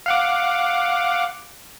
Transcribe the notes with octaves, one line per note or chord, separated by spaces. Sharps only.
F5 F#5 D6